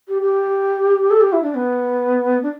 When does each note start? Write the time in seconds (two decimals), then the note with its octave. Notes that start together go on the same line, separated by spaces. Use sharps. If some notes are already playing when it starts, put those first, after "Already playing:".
0.08 G4
0.22 G4
1.11 A4
1.21 G4
1.33 E4
1.43 D4
1.55 B3
2.43 D4